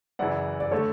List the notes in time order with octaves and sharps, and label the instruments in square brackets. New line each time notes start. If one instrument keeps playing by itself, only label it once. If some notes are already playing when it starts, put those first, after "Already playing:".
[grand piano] F#2 C#3 E3 [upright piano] D5 F#5
[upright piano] D5
[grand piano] D3 A3 [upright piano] A4 C#5